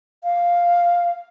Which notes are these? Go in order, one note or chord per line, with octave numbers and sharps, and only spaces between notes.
F5